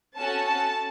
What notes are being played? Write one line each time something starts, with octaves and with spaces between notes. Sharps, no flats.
C#4 F#4 A4 A5
A5